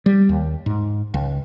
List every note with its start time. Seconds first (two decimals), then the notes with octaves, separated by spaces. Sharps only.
0.06 G3
0.29 D#2
0.66 G#2
1.14 C#2